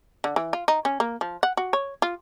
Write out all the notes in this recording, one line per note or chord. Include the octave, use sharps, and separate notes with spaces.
D3
E3
F4
D#4
C#4
A#3
F3
F#5
F#4
C#5
F4